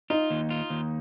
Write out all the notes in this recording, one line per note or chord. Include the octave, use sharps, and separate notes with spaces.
D#4 F4
D#2
F4
D#2